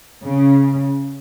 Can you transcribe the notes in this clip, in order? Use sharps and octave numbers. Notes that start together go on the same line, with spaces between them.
C#3